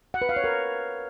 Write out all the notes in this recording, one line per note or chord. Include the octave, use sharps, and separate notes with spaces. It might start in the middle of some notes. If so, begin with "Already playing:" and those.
F#5
B4
F5
C#5
A#4